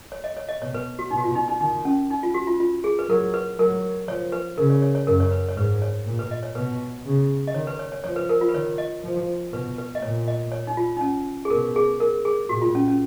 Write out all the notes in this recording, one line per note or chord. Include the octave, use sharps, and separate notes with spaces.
C#5
D#5
C#5
D#5
B2 C#5
B4
F#4
B2 D#4
F#4
F4
D#4
D#4
D#3 D#4
C#4
D#4
F4
F#4
F4
F4
G#4
B4
F#3 A#4
B4
F#3 A#4
F3 C#5
B4
C#3 A#4
C#5
C#5
C#5
F#2 A#4
C#5
B4
C#5
G#2 B4
C#5
A#2
B4
D#5
C#5
B2 B4
C#3
D#5
D#3 C#5
B4
C#5
C#5
F3 C#5
B4
A#4
F4
B4
D#3 C#5
D#5
F3
B2 B4
B4
D#5
A#2 C#5
D#5
C#5
D#4
F4
D#4
C#4
G#4
B2 A#4
G#4
A#4
G#4
A#2 F#4
F4
C#4
C#4